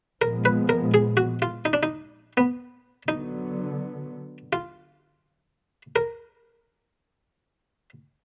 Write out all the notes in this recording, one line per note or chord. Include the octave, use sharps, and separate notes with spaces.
A#2 F3 G#3 B3 A#4
B4
A#4
G#4
F#4
F4
D#4
D4
D#4
B3
D3 F#3 B3 D#4
F4
A#4